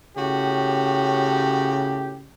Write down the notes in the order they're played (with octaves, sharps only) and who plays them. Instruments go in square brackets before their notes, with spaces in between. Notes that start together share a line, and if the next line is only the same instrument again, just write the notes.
[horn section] A2 F#4 G4 [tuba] C#3